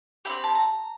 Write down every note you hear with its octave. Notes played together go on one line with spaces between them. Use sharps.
C4 E4 G4 B5
A5
A#5